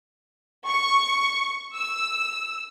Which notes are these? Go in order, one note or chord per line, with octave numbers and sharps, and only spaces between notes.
C#6
E6